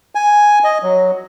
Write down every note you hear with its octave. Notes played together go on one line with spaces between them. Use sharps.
G#5
D#5
F#3